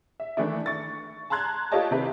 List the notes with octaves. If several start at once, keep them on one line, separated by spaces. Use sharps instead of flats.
E5
D#3 E3 A3 D4 E4
C#6 A6
A5 A#5 C6 F#6 G#6
F4 G4 A4 C#5 D#5 A5
C3 D#3 C4 E4 G4 B4